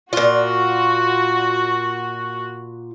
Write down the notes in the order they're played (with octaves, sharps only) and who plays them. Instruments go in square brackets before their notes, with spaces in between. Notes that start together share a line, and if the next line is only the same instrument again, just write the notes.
[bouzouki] A#2 F4 [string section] F#4